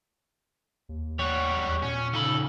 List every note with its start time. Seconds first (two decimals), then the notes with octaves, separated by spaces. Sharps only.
0.89 D#2
1.19 G3 F#4 C#5
1.56 E2
1.82 A#2 C#4
2.13 C#3 D#4 A4 B5